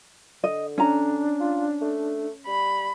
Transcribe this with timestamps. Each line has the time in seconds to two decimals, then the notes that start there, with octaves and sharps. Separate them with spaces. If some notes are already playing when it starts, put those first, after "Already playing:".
0.44 D3 D#5
0.78 C#4 D4 A#5
1.40 F4
1.81 A3
2.47 G3 B5